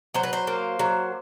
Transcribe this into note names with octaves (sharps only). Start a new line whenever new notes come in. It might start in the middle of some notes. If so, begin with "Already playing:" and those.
F#3 C5
B4
C5
A#3
F#3